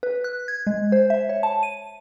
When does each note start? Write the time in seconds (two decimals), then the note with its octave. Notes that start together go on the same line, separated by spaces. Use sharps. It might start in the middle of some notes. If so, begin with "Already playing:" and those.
0.03 B4
0.24 F#6
0.48 G#6
0.67 G#3
0.92 C5
1.10 E5
1.29 C#5
1.43 A5
1.63 D#7